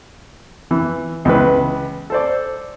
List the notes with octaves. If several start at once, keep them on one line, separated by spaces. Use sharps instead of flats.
E3
C#2 E3 B4
A4 C5 D5